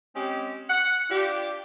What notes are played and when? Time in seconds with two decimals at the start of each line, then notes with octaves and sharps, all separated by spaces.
0.15 G#3 C4 C#4 G4
0.69 F#5
1.10 D4 F4 G4